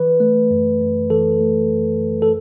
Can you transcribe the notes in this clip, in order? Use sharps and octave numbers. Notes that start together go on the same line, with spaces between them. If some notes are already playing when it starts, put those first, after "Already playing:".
Already playing: E3 B4
A3
F#2
F#2
E3 A4
A3
F#2
F#2
A4